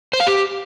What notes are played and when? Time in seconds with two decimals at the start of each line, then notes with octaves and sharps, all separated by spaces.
0.13 C5
0.20 F5
0.27 G4